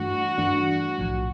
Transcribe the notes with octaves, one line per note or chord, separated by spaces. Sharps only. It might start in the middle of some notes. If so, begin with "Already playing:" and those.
Already playing: G2 E3 A3 D4 F#4
G2 E3 A3 D4
B1 A2 F3